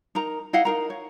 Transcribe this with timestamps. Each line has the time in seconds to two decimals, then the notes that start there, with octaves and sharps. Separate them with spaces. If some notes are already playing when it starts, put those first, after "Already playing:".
0.15 D#4 A#4 A#5
0.53 E4 D#5 F5 F#5
0.65 D#4 A#4 A#5
0.90 C#5